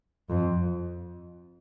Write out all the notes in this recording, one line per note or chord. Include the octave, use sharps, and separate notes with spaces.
F2